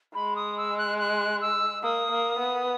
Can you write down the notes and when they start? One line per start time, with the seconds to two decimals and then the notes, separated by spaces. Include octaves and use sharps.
0.15 G#3 B5
0.36 D#6
0.57 E6
0.78 F#6
0.98 F#6
1.41 E6
1.83 A#3 D#6
2.11 A#3
2.39 B3